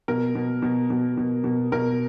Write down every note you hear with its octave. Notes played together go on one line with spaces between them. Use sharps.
B2 A#4
B2
B2
B2
B2
B2
B2 A#4